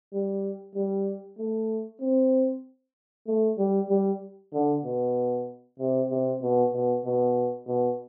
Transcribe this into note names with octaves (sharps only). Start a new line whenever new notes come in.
G3
G3
A3
C4
A3
G3
G3
D3
B2
C3
C3
B2
B2
B2
B2